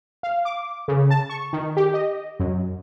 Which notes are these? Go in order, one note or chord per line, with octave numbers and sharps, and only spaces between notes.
F5
D6
C#3
A5
C#6
D#3
G4
D#5
F#2